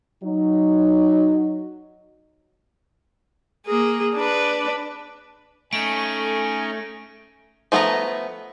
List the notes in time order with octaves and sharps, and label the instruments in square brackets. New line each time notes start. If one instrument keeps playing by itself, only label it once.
[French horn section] F#3 D#4
[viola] A#3 G#4
D4 B4
[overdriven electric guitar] A3 [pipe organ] C#4 D#4 [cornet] G#5 [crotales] D7
[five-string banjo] F3 A3 B3 G#4 A#5